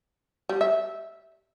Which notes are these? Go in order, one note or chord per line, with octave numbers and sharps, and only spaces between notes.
G3
E5